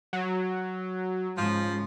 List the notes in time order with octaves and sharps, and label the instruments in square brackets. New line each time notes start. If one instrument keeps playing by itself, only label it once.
[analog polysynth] F#3
[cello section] G#2 C#3 [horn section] F3